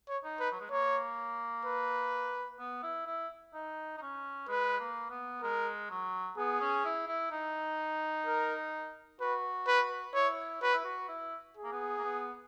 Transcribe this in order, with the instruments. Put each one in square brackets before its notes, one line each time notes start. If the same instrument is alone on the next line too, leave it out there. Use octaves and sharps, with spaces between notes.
[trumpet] C#5
[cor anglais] D#4
[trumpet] B4
[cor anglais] F#3
G#3
[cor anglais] A#3 [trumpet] C#5
[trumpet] B4
[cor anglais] B3
E4
E4
D#4
D#4
C#4
[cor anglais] G#3 [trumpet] B4
[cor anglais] A#3
B3
[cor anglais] G#3 [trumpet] A#4
[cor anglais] F#3
[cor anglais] B3 [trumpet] G#4
[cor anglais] C#4
E4
E4
D#4
[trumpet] A#4
[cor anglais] F#4 [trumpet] B4
[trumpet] B4
[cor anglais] E4 [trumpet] C#5
[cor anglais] F#4 [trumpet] B4
[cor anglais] E4
F#4
E4
[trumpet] G#4
[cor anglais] A#3
B3
A#3
B3